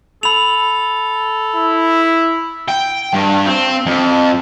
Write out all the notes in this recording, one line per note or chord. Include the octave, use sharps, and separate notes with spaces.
A4 B5 F7
E4
G5
G2
C4
F2